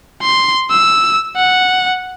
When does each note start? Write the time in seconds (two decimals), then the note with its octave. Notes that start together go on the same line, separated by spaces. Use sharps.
0.22 C6
0.71 E6
1.36 F#5